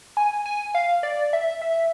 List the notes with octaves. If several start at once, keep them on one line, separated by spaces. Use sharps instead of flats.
G#5
G#5
F5
D5
E5
E5